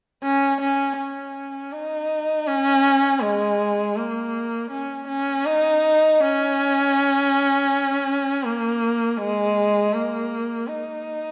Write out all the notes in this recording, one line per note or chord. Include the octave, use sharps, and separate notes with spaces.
C#4
C#4
C#4
D#4
C#4
G#3
A#3
C#4
C#4
D#4
C#4
A#3
G#3
A#3
D#4